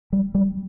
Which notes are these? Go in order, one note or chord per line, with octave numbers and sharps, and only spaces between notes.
G3
G3